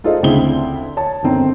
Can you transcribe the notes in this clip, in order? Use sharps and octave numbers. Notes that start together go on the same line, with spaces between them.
D#4 F4 G#4 A4 C5 D#5
D2 C#3 C4 E4 G7
C#5 A5
G1 D#3 C4 A#5